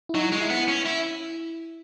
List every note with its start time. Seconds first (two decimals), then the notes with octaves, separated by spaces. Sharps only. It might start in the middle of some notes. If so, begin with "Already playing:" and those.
0.09 E4
0.14 F#3 D#4
0.32 G#3
0.41 E4
0.50 B3
0.68 C#4
0.86 E4